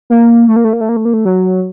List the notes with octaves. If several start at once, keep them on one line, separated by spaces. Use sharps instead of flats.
A#3
A3
A#3
A3
A#3
A3
A#3
A3
A#3
A3
F#3